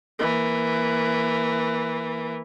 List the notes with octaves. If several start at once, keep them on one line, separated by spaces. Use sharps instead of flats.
E3 A#3